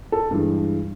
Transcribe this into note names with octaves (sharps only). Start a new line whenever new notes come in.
A4
G2 E3 G#3